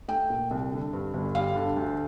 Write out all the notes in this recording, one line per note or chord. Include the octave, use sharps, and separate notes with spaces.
A3 G5
A#2
C2
D3
G2
G1
G3 F5
D3
D2